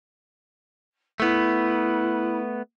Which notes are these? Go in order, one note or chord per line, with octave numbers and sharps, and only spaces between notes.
A3 B3 E4